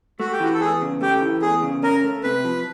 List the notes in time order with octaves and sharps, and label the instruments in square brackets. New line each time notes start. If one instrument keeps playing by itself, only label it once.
[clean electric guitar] A3 [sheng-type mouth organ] F#4
[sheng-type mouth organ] G4
[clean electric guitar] E3 [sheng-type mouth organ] F#4
[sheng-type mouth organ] A4
[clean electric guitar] E2 [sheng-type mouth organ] G#4
[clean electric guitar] C#3
[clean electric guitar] A3 [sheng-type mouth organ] G4
[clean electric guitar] E3
[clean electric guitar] E2 [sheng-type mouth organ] G#4
[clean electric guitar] C#3
[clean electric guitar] C#4 [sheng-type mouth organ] A#4
[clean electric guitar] A3
[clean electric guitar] C3 [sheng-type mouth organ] B4
[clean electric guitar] F3